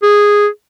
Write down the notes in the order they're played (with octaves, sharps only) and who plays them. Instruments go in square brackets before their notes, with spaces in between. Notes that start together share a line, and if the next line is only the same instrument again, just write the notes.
[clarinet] G#4